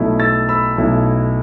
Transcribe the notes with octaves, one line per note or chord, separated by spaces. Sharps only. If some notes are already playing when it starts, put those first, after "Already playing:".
Already playing: B1 B2 A3 E4
E6 A6
B5 E6
B1 B2 A3 E4